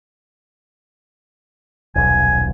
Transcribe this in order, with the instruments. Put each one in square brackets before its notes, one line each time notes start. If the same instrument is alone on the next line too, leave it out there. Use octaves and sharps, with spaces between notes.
[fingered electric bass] D#1 B1 [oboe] G#5